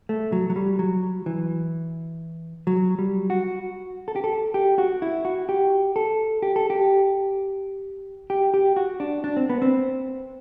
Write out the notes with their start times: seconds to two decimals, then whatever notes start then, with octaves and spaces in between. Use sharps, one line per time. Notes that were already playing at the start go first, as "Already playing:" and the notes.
0.09 A3
0.32 F#3
0.50 F#3
0.56 G3
0.79 F#3
1.26 E3
2.67 F#3
2.99 G3
3.30 F#4
4.08 A4
4.16 G4
4.24 A4
4.54 G4
4.78 F#4
5.02 E4
5.25 F#4
5.49 G4
5.96 A4
6.42 G4
6.56 A4
6.70 G4
8.30 G4
8.54 G4
8.76 F#4
9.00 D4
9.24 D4
9.37 C4
9.49 B3
9.62 C4